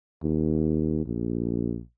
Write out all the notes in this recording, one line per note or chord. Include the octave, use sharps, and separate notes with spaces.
D#2
A#1